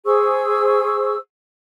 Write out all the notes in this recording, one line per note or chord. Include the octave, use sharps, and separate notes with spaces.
G#4 C5 C#6 E6